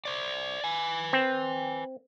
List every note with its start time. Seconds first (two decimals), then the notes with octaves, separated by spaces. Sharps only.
0.05 C5 D5
0.64 B4 G#5
1.13 C4